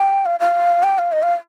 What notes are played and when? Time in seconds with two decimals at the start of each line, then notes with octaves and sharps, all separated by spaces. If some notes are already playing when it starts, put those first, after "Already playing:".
Already playing: G5
0.26 F5
0.40 F5
0.83 G5
0.98 F5
1.12 D#5
1.22 F5